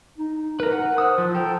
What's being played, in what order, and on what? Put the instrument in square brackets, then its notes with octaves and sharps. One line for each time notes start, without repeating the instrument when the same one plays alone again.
[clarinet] D#4
[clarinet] A#4 [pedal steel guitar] B4 A#5
[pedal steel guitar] F#5
[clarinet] C5 [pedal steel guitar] D#6 E6 F#6
[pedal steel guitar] F3
[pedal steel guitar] A4 A#4 [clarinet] G5